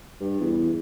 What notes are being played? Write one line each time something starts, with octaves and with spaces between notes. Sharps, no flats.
G2
E2